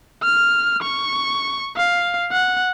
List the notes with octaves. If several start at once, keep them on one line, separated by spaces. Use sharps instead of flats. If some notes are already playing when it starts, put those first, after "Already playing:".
F6
C#6
F5
F#5